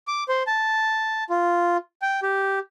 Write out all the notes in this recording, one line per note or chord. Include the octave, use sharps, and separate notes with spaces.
D6
C5
A5
F4
G5
G4